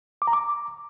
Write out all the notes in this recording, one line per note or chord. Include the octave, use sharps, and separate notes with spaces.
D6
A#5
D6